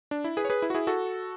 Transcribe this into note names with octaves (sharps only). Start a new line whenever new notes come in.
D4
E4
G#4 B4
C#5
G#4 B4
E4
F#4
E4 G#4
F#4 A4